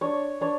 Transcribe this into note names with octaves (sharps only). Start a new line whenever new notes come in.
D4 C#5
D4 C#5